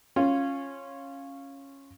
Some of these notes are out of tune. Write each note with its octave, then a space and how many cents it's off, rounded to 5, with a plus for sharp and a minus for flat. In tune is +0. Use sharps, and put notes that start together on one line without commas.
C#4 -10 F4 +0